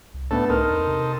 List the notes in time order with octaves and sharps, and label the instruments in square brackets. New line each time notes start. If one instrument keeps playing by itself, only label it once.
[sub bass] C2
[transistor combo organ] A2 A3 A4 [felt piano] B3 D4
[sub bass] C2 [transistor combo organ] C4 D#4 A4 [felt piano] A#4 F6
[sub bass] E2
C3